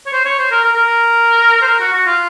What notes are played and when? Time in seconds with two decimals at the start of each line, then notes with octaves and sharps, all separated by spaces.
0.06 C#5
0.13 C5
0.25 C#5
0.39 C5
0.51 A#4
0.64 A#4
0.77 A#4
1.62 C5
1.67 A#4
1.81 F#4
1.93 F#4
2.06 F4